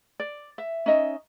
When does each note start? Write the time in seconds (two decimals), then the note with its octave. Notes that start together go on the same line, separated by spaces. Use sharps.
0.20 D5
0.58 E5
0.86 C#4 D#4 D#5 E5